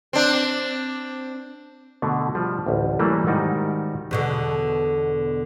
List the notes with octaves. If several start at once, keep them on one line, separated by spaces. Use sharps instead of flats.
C4 D4
B2 D3 A3
F3 G3
A1 D2
E3 F#3 G3 A3 A#3
G#2 D#3 G3 D#4 F#4
E2 B2 D3